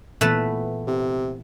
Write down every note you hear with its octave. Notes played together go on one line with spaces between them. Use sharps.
A#2 E3 A3 B3 B4 A5
C3